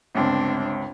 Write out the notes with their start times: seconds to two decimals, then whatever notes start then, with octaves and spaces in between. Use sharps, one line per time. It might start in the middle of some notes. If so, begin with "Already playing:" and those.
0.15 G1 C#2 C4 D4